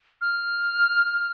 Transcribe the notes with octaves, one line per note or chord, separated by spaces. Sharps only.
F6